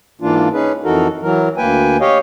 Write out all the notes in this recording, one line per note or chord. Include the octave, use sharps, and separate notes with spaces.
G#2 E3 A#3 D4 F4
C#4 D#4 G#4 B4
F2 E3 D#4 F#4 A4 A#4
E3 F#3 A#4
D2 A#3 B4 G5 G#5
G4 C#5 D#5 F5